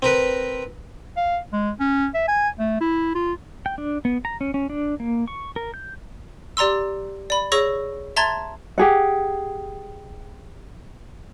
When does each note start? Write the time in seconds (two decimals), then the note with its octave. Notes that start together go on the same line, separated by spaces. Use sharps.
0.02 C4 A#4 B4
1.17 F5
1.53 G#3
1.80 C#4
2.15 E5
2.28 G#5
2.59 A3
2.81 E4
3.15 F4
3.66 G5
3.78 D4
4.05 B3
4.25 A#5
4.41 C#4
4.54 C#4
4.70 D4
5.00 A#3
5.28 C#6
5.56 A#4
5.74 G6
6.57 G4 D5 A#5 C6 E6
7.30 D5 B5
7.52 G#4 C#5 C#6 E6 A#6
8.16 E5 A5 A#5 C6 G#6 A6
8.78 G4 G#4 F#5